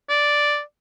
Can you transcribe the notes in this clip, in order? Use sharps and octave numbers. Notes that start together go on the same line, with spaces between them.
D5